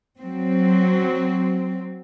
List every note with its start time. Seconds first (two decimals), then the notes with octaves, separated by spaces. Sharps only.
0.18 F#3 C4